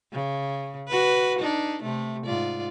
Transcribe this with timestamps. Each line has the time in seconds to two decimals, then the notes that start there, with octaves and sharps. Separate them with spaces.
0.13 C#3
0.88 F#4 B4
1.39 D4 D#4
1.83 C3 A3
2.25 G#2 F4 D5